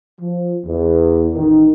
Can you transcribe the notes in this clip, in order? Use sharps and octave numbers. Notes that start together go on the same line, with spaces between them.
F3
E2
A1 D#3